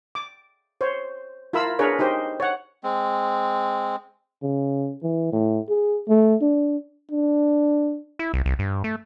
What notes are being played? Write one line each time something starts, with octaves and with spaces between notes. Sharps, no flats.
D6
C5 C#5
E4 F4 A#4 B5 E6
D4 G#4 A#4 B4 C#5
D#4 G4 C5 D#5
C#5 F#5
G#3 C4
C#3
E3
A2
G#4
A3
D4
D4
E4
C2
C2
G2
A3